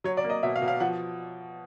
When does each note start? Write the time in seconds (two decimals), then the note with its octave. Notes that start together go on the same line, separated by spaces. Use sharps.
0.04 F#3 C#5
0.17 D5
0.24 A#3
0.30 D#5
0.43 B2 E5
0.56 F5
0.62 B2
0.68 F5
0.80 F3 F#5